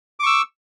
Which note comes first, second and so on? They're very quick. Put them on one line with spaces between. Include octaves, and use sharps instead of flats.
D6 C#6 E6